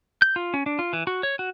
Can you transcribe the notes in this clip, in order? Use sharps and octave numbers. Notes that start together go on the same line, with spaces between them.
G6
F4
C#4
D4
F4
E3
F#4
C#5
F#4